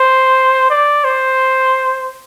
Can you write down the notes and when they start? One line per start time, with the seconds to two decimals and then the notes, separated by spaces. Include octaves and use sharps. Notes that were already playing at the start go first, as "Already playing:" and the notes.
Already playing: C5
0.70 D5
1.05 C5